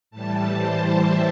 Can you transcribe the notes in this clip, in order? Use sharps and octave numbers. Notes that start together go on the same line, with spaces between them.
A2 E3 G3 A5
C5
E5